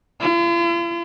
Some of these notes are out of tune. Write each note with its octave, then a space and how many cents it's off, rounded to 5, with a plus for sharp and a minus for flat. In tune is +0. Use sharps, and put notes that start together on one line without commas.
F4 -45